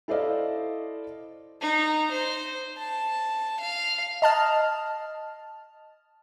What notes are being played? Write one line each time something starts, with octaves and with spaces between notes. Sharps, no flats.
E4 A4 C5 D5 D#5 F5
D#4
C5
A5
F5
D#5 A5 F6